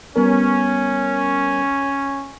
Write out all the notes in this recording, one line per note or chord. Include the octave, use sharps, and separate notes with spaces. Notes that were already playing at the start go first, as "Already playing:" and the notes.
G3 B3 C#4 A#4